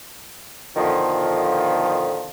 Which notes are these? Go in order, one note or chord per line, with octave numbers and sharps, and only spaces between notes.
F2 B2 D3 D#3 F3